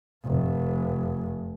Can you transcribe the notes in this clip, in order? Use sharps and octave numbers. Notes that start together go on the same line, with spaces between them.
F1